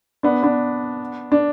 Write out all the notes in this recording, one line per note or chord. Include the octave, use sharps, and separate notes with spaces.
B3 D4
B3 D4
D4